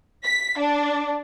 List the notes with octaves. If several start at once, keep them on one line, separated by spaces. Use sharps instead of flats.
B6
D4